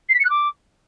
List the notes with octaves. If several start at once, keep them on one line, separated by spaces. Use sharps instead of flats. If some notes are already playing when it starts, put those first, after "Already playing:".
C7
B6
C#7
F#6
D6